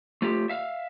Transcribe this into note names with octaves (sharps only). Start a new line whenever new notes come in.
A3 F4 G4
E5 F5